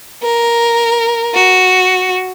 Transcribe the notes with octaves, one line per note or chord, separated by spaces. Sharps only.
A#4
F#4